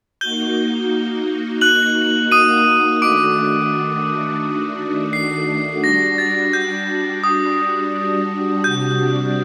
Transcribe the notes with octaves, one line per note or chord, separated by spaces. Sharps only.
A#3 D#4 F#4 G6 G7
F#6 F#7
D#6 D#7
D#3 A3 D4 F#4 D6 D7
C7
G3 D4 F#4 A#6
A6
G6
D#6
C3 G3 D4 F#4 G6